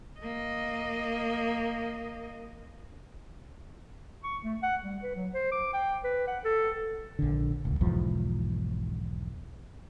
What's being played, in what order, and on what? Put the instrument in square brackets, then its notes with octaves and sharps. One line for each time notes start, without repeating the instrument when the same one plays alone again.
[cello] A#3 D#5
[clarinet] C#6
A3
F#5
G3
B4
F#3
C5
D6
G5
B4
F#5
A4
[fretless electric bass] A#1 D3
D#1 C#2
B1 E2 G#2 F3